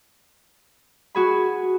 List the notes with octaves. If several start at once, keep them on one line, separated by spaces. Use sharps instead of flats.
F#4 G#4 B5